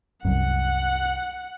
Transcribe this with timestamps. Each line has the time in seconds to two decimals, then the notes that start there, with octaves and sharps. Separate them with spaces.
0.25 C2 F#2 F#5